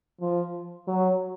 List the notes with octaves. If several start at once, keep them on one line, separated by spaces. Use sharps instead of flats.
F3
F#3